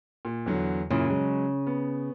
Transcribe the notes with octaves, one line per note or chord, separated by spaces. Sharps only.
A#2
E2 D3 F#3
F#2 A#2 C#3 E4
F#3 G#3
B3